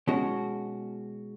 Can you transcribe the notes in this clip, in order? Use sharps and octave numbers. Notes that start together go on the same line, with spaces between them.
B2 G#3 C#4 F#4